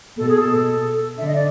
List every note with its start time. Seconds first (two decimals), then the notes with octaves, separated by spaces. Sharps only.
0.18 B2 A4
0.29 G#4
0.40 A4
1.18 D3 E5
1.27 D#5
1.35 D5